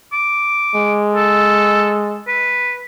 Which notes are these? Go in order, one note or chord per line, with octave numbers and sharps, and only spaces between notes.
D6
G#3
A4
B4